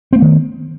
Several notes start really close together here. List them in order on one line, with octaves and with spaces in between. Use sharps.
C4 A3 B3 D#3